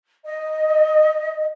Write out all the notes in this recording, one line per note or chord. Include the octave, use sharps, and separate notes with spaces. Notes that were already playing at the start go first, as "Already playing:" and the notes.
D#5